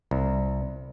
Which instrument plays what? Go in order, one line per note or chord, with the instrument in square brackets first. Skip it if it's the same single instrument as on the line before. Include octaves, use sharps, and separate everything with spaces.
[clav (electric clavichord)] C2